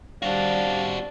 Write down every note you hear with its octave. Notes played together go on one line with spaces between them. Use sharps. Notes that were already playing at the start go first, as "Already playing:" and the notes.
G3 C4 D4 F#4 F5